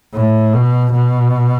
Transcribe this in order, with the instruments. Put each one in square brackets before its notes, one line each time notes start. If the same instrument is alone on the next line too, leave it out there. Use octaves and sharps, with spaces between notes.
[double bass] A2
B2
B2